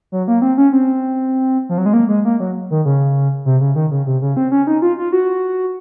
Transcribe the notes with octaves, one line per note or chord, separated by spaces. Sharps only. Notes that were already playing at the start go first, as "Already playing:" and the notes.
F#3
A#3
C4
C#4
C4
F3
F#3
G#3
A#3
G#3
A#3
F#3
D#3
C#3
C3
C#3
D#3
C#3
C3
C#3
C4
C#4
D#4
F4
F4
F#4